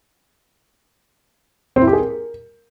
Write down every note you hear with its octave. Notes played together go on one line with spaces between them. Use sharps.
C4
E4
G4
G#4
A#4